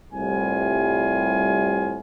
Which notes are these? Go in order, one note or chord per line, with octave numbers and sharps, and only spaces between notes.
C2 A2 C3 G3 F4 G#5